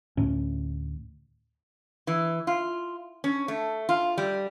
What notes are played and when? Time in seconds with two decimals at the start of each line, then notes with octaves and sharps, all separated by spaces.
0.17 D2 A2 C#4
2.07 E3
2.47 F4
3.24 C#4
3.48 A3
3.89 F4
4.18 G3